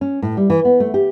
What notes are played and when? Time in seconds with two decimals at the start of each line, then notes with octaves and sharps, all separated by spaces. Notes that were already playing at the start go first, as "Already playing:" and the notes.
0.01 C#4
0.22 A2
0.37 G3
0.50 E3
0.65 B3
0.80 A3
0.94 G4